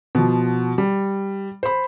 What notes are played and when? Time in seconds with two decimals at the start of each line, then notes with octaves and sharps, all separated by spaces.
0.15 B2 F3
0.78 G3
1.63 C5 B5